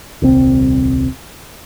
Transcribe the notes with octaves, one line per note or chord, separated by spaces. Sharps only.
D#1 C2 C4